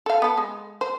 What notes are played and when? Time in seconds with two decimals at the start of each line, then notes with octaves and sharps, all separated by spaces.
0.06 A4 F5
0.22 B3 A4
0.38 G#3
0.81 C5